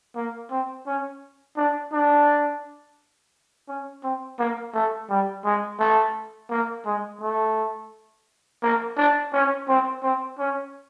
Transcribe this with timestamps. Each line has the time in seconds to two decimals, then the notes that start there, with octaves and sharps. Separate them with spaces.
0.16 A#3
0.51 C4
0.87 C#4
1.57 D4
1.93 D4
3.69 C#4
4.04 C4
4.39 A#3
4.74 A3
5.10 G3
5.45 G#3
5.80 A3
6.51 A#3
6.86 G#3
7.21 A3
8.63 A#3
8.97 D4
9.33 C#4
9.68 C4
10.03 C4
10.39 C#4